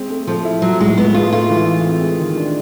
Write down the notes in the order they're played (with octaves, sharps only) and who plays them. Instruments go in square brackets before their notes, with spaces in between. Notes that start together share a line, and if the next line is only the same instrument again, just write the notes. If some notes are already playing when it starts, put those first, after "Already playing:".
Already playing: [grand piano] G#3 C4
A3
[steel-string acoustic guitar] F3 [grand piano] A3
[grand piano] E4
[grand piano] F3 [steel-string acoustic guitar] F#3
[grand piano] A2 [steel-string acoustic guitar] G#3
[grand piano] A2 [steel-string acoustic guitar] B3
[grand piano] G#3 [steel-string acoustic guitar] F4
[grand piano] A3 [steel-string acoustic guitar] F4
[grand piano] E3
E3
C4
G#3
D#3
D4